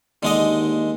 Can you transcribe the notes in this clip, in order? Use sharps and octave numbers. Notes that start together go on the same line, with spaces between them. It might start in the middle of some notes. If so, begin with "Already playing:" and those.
D#2 D3 G#3 D#5